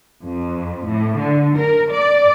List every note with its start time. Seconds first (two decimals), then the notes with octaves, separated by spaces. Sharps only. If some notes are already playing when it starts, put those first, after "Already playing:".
0.23 F2
0.85 A2
1.18 D3
1.56 A#4
1.92 D5